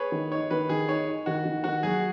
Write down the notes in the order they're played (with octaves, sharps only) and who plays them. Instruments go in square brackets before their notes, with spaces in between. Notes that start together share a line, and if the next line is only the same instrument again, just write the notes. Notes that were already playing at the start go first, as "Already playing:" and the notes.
Already playing: [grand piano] G#4 B4 C#5
[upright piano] D#3
[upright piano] D#4 [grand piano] C#5
[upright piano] D#3 [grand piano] B4
[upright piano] D#3 [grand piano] G#4
[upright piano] D#4 [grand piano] C#5
[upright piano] D#4
[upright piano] D#3 [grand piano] F#4
[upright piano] D#3
[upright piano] D#3 [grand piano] F#4
[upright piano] F#3 [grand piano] G#4